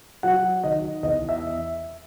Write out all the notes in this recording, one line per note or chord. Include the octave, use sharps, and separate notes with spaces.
F#3 F#5
D#3 D#5
E2 D#5
E5